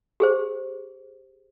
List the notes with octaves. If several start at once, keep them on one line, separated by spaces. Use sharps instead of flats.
G4 G#4 C5